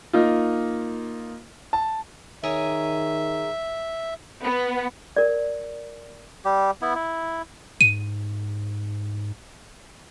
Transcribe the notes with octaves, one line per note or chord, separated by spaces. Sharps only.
A#3 D#4 F4
A5
D#3 G#4 A#4 C#5 E5
B3
A#4 D5
G3 G4
B3 E4
E4
G#2 D#7